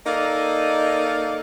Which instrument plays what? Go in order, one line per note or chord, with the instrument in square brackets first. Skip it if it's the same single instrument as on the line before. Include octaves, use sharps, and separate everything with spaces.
[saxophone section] A#3 D#4 A4 D5 D#5 F5